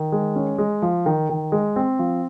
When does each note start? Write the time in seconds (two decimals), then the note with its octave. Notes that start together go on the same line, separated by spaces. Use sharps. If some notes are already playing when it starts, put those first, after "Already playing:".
Already playing: D#3
0.12 G#3
0.36 C#4
0.58 G#3
0.82 F3
1.06 D#3
1.29 D#3
1.52 G#3
1.76 C4
1.99 F3